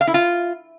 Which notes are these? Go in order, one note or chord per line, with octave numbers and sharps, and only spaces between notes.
F5
E4
F4